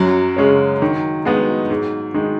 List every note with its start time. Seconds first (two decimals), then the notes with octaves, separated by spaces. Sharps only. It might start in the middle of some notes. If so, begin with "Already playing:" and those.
Already playing: F#2 F#3
0.36 C#3 G#3 C#4
0.82 D#3
1.25 G#3 B3 D#4
1.70 G#2
2.14 D#3 G#3 D#4